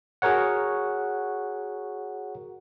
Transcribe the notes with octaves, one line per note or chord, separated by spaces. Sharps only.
F#4 G#4 A#4 C#5 F#5